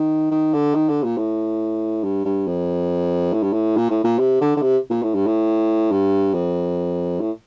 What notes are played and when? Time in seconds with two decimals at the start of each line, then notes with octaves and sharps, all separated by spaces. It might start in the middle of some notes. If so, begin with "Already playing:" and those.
Already playing: D#3
0.31 D#3
0.54 D3
0.74 D#3
0.89 D3
1.03 A#2
1.17 A2
2.04 G2
2.25 G2
2.47 F2
3.33 A2
3.43 G2
3.53 A2
3.77 A#2
3.90 A2
4.04 A#2
4.19 C3
4.41 D3
4.56 D3
4.62 C3
4.90 A#2
5.03 A2
5.15 G2
5.27 A2
5.91 G2
6.34 F2
7.21 A2